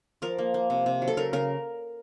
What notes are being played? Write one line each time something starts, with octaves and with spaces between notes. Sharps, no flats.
F3 A#4
A#3
A#3
C3
C3
F#3
A4
C#3 A#4
C#3 A#4